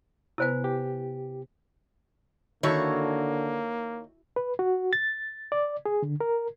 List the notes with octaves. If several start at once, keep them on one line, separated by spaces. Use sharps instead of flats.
C3 B3 E4 B4 C5 G#5
G4
D3 D#3 A#3 E4 F#4 A4 C#5
B4
F#4
A6
D5
G#4
D3
A#4